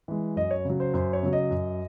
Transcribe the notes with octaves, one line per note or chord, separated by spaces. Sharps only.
E3 G#3
F#2 D#5
C#5
C#3 F#3
C5
F#2 C5
C#5
C#3 F#3
D#5
F#2